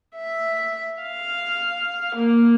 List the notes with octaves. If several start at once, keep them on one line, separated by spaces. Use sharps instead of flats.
E5
F5
A#3